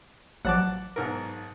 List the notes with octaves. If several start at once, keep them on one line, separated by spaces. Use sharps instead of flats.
A1 F3 F#3 F#5 A5 D6
B1 G#2 A#4